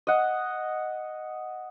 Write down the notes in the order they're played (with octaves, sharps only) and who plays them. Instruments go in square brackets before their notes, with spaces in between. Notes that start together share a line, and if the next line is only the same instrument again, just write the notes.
[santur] D#5 F#5